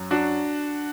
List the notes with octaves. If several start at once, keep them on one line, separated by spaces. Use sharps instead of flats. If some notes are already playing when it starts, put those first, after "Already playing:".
Already playing: F#2 F#3
D4 F#4